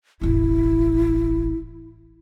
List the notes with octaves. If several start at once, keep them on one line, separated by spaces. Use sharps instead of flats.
E1 A1 E4